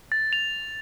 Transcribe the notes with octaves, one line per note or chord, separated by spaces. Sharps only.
A6
F7